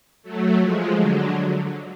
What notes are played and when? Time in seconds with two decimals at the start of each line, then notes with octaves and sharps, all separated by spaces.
0.23 F#3 A3
0.59 F3 G#3
0.96 D3 F#3